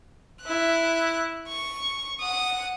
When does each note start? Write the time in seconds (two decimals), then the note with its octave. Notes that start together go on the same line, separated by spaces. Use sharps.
0.42 E4 F#6
1.48 C#6
2.20 F#5 D#6